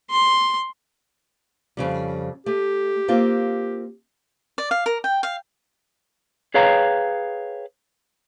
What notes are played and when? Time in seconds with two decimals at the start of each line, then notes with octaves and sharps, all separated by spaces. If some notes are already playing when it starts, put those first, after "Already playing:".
0.10 C6
1.77 F2 C#3 G3
2.46 A3 G4
3.08 A#3 C4 F4
4.58 D5
4.71 F5
4.86 A#4
5.04 G5
5.23 F5
6.54 G#4 B4 C#5 F5 G5 A#5